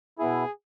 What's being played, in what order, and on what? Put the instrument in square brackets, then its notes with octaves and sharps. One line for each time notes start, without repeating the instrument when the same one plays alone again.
[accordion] B2 B3 E4 [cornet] G#4